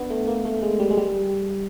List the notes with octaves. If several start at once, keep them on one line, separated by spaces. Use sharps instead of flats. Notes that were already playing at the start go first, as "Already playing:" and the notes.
Already playing: B3 D4
A3
A#3
A3
G#3
G3
G#3
G3